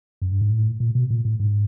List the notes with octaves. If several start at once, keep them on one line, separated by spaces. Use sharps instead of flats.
F#2
G2
G#2
A2
A#2
B2
A#2
A2
G#2